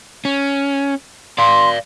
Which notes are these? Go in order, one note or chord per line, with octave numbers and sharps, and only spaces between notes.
C#4
D5 F5 C6